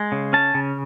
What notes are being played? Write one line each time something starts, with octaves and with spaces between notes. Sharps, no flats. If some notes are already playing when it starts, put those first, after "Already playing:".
Already playing: G#3
C#3
C#4 A5
C#3